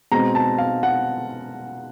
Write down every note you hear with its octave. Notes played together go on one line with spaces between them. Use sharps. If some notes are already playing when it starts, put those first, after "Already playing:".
B2 G#3 C4 A#5
A5
F5
F#5